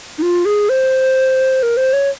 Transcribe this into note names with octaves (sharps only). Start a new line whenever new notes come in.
D#4
F4
G#4
C5
A#4
C5
C#5